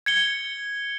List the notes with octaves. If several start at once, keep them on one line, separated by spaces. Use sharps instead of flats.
G#6 C#7 G7